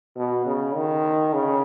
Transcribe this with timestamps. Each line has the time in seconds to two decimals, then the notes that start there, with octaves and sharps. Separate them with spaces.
0.17 B2
0.46 C#3
0.75 D#3
1.34 C#3